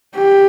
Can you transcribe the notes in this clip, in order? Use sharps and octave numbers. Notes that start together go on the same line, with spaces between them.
G4